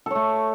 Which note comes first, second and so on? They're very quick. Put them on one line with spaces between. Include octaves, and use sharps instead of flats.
A4 C#5 A3